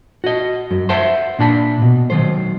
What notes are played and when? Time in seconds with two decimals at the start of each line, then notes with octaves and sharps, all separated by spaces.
0.24 F#4 D#5
0.71 F#2
0.89 B4 C5 E5 F#5 A5 C6
1.39 A#2 D4 A5 B5
1.82 B2
2.10 D#3 F#3 C5